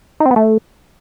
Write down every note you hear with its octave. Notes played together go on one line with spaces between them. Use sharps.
D#4
C4
B3
A3